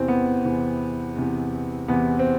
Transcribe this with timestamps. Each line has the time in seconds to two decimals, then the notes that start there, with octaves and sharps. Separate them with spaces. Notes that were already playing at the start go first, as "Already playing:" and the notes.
Already playing: E2 C3 E3 C4
0.08 B3
0.44 E2 C3 E3
1.16 E2 C3 E3
1.88 E2 C3 E3 B3
2.19 C4